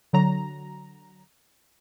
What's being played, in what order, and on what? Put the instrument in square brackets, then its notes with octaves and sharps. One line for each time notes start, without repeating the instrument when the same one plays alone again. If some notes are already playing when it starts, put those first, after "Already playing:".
[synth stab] D3 F#3 A#5